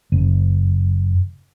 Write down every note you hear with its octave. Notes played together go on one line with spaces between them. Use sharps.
F#1